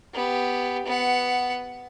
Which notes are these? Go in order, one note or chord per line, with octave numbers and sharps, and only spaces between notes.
B3 G4
B3 F#5